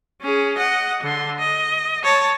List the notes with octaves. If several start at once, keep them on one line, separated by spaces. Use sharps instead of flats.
C#4 G#4
D#5 F#5
D3 C6
D#5
C#5 A5